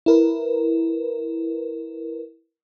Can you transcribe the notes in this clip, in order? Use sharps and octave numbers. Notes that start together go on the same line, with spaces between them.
E4 A#4 B4